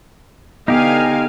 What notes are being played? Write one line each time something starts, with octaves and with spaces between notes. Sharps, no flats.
D3 B3 D#4 G4 F5 G#5